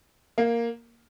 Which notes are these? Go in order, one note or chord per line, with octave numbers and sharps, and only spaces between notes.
A#3